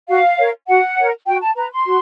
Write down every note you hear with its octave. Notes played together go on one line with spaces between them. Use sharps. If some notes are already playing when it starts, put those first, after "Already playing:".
F#4 F5
A#4 C#5
F#4 F#5
A#4 C#5
F#4 G5
A5
B4 A#5
C6
F#4